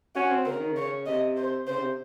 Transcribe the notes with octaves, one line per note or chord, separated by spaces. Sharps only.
C#4 F#4
C4
C#3 A#4
D#3
C#3 C#5
C3 D#5
C5
C#3 C5
C3